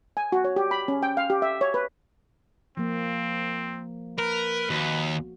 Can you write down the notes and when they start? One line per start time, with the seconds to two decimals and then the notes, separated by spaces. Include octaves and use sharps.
0.17 G#5
0.32 F#4
0.44 C#5
0.56 G4
0.71 B5
0.88 C#4
1.03 G5
1.17 F5
1.30 G4
1.42 E5
1.61 C#5
1.74 B4
2.77 F3 A#3 C4
4.19 A#4 B4
4.70 D#2 F#4